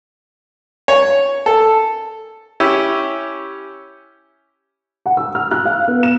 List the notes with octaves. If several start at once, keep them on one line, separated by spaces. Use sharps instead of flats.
C#5
A4
C#4 E4 G4
F#5
E6
F6
F#6
F5
B3
E7